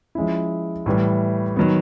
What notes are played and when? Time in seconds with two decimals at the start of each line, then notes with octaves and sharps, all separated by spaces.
0.15 F3 G#3 C#4 E4
0.86 A2 E3 G3
1.56 D#3 F#3 B3